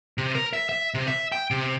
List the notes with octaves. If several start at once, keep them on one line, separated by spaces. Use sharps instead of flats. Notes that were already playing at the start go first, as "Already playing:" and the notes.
C3
A#4
E5
E5
C3
E5
G5
C3